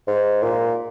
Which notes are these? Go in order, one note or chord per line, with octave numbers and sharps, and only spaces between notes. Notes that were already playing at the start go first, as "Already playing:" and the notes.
G#2
A#2